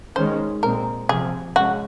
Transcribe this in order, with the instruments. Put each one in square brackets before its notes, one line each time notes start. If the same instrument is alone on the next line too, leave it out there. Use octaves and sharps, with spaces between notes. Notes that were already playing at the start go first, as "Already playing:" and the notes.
[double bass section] D#3 G#3 C#4 [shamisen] C5
[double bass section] A#2 G#3 C4 [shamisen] A#4
[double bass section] C3 F3 C4 [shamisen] G#4
[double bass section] G#3 C#4 [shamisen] F#4